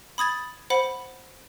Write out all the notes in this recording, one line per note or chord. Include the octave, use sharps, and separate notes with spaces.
B5 D#6 G#6 A6
C5 F#5 B5